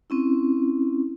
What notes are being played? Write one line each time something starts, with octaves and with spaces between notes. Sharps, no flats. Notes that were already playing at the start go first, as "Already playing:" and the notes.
C4 C#4 E4